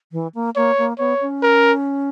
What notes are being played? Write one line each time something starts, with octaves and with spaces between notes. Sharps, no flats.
E3
A#3
A#3 C#5
A#3
B3 C#5
C#4
A#4